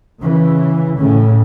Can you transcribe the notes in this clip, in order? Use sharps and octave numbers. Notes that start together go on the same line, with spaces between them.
C#3 E3
A2 C#3